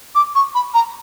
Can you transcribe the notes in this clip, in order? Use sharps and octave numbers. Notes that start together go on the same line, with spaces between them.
D6
C#6
B5
A#5